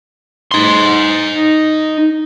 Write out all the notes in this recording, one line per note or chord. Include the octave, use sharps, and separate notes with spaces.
D#4 C6